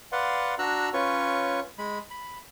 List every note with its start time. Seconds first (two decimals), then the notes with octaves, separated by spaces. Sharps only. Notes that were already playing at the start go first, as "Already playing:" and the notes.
0.12 B4 D5 F5 F#5 C6
0.59 D4 F#4 A#5 E6 F#6
0.94 C#4 F4 B4 C#5 C#6
1.78 G#3 B5
2.11 B5